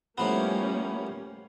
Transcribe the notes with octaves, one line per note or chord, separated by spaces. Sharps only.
A2 F3 G3 A#3 B3 C#4